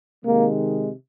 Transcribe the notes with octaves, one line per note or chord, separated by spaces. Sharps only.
C3 D#3 G#3 A#3